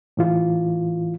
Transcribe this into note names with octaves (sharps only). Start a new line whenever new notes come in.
A2 E3 F4